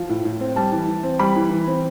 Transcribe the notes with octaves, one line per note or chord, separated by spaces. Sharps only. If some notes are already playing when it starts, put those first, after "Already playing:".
Already playing: F3
A2
A2
C4
G3 A5
E3
E3
C4
G3 B5
E3
E3
C4